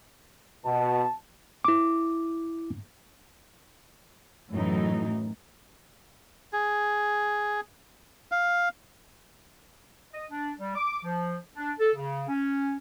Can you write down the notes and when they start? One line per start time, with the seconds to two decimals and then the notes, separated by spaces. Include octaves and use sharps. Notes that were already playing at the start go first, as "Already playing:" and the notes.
0.66 B2 A5
1.65 E4 D6
4.51 F#2 A2 E3 F#3 A3 D#4
6.53 G#4
8.32 F5
10.13 D#5
10.30 D4
10.58 G3
10.76 D6
11.04 F3
11.56 D4
11.79 A4
11.95 C#3
12.28 C#4